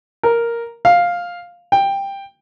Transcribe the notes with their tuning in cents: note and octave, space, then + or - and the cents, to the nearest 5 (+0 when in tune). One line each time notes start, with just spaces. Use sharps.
A#4 +0
F5 +5
G5 +10